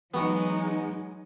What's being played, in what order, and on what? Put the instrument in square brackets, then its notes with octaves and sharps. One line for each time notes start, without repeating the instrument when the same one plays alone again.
[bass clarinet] E3 [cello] F#3 [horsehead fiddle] G#3 D#4 [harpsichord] B3 F#4 F#5